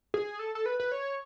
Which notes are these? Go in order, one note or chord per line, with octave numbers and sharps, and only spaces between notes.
G#4
A4
A4
B4
B4
C#5